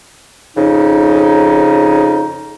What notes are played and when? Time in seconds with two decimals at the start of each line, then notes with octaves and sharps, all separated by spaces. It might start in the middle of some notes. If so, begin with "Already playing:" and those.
0.55 F2 C#3 D#4